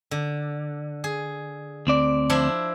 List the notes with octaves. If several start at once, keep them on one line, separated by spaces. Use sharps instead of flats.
D3
G#4
D2 C4 D5
F3 D4 E4